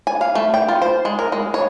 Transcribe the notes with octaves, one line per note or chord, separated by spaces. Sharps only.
G#5
F5
A3
G5
F4
C5
G#3
A#4
G#3
C#5